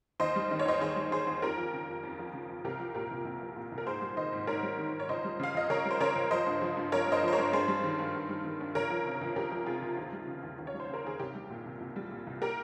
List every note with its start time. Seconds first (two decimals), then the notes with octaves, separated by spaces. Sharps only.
0.20 D#2 C5 D#5
0.36 G3
0.51 D#3 D#5
0.59 C#5
0.65 D#2 C5 D#5
0.81 D#2 G#4 C5
0.96 G3
1.11 D#3 G#4 C5
1.27 D#2
1.42 F2 G4 A#4
1.57 F3
1.73 C#3
1.88 F2
2.03 F2
2.19 F3
2.33 C#3
2.49 F2
2.64 C2 G4 A#4
2.80 F3
2.94 A#2 G4 A#4
3.11 C2
3.25 C2
3.41 F3
3.56 A#2
3.72 C2
3.78 A#4
3.86 G#2 G#4 C5
4.01 G3
4.17 D#3 C5 D#5
4.33 G#2
4.47 G#2 A#4 C#5
4.63 G3
4.78 D#3
4.94 G#2
5.00 C#5
5.09 C#2 C5 D#5
5.24 G3
5.40 C#3 F5
5.55 C#2 D#5
5.70 C#2 A#4 C#5
5.85 G3
5.91 C5
6.00 C#3 A#4 C#5
6.16 C#2
6.31 F3 C5 D#5
6.46 G2
6.61 F3
6.77 G2
6.92 F3 A#4 C#5
7.07 G2 C5 D#5
7.23 F3 C5
7.33 A#4 C#5
7.38 G2
7.53 G2 G#4 C5
7.68 G3
7.84 D#3
7.99 G2
8.15 G2
8.29 G3
8.45 D#3
8.61 G2
8.75 C#2 A#4 C#5
8.90 F3
9.05 C3
9.21 C#2
9.36 C#2 G4 A#4
9.51 F3
9.66 C3 F4 G#4
9.82 C#2
9.97 D#2
10.13 G3
10.27 C#3
10.43 D#2
10.58 D#2
10.67 C#5
10.74 G3
10.80 C5
10.89 C#3 A#4
11.04 D#2 G#4
11.19 C2 G4
11.35 G3
11.50 A#2
11.66 C2
11.81 C2
11.96 G3
12.11 A#2
12.27 C2
12.42 G4 A#4